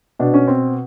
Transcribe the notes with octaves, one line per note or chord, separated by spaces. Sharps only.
B2 D4
C#4
C4